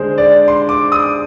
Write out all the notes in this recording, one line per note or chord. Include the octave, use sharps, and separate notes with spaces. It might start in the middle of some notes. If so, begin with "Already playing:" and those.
Already playing: D3 G#3 G#4 C5
D5
C6
D6
D#6